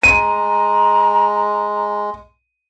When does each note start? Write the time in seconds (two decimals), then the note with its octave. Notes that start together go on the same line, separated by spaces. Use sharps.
0.03 G#3 A#5 D#7